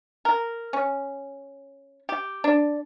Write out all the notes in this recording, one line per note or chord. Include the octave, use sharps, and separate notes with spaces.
A#4
C#4
G4
D4